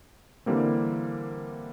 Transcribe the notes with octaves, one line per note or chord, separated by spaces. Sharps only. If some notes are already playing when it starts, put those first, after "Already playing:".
D3 E3 G3 A#3 C4